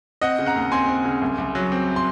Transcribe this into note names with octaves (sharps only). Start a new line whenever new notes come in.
C4 D#5 F#5
C#3
F#5 A#5
D#2
C4 G#5 C6
C4
C#3
C2
C2
F#3
C4
C6